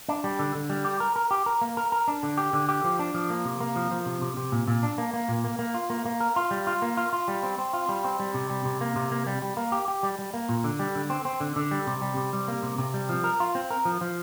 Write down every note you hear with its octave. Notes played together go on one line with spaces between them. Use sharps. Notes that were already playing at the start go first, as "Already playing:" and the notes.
D4
G3
D3
D3
G3
G4
A#4
A#4
G4
A#4
A#3
A#4
A#4
D4
D3
G4
D3
G4
F3
D4
F3
A#3
C3
A#3
F3
F3
C3
C3
C3
A#2
A#2
D4
A#3
A#3
A#2
A#3
A#3
F4
A#3
A#3
A#4
F4
G3
F4
A#3
F4
F4
G3
C4
C4
F4
G3
C4
G3
C3
G3
C3
A#3
C3
A#3
G3
G3
A#3
G4
G4
G3
G3
A#3
A#2
D3
G3
D3
C4
C4
D3
D3
G3
C3
G3
C3
G3
A#3
C3
C3
G3
F3
A#4
F4
C4
A#4
F3
F3